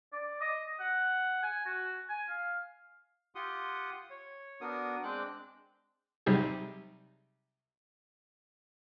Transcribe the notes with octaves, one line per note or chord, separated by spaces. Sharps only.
D5
D#5
F#5
G#5
F#4
G#5
F5
F4 G4 F#5 C6 D#6
C#5
B3 D4 F#4 A#4 D#6
G#3 C4 D4 G5 D6 F#6
C3 F#3 G3 D#4 G4 G#4